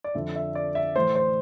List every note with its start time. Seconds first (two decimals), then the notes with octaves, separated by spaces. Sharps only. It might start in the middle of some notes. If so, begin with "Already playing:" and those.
0.04 D5
0.15 F2 D3 F3 E5
0.36 E5
0.55 D5
0.75 E5
0.95 A2 E3 C5
1.15 C5